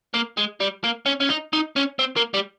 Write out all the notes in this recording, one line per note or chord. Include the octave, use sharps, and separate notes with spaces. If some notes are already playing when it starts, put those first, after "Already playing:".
A#3
G#3
G3
A#3
C#4
C#4
D#4
D#4
C#4
C4
A#3
G3